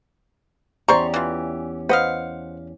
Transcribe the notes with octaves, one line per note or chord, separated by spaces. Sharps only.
E2 C#4 G4 C5 D5 A#5 C6 C#6
E3 F4
B4 C5 D#5 F5 F#5